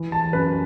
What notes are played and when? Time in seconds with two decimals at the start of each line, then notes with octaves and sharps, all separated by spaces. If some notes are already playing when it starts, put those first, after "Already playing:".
Already playing: E3
0.12 A5
0.33 F#2 B4